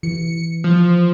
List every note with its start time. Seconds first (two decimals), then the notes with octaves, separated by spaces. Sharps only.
0.03 E3 C#7
0.64 F3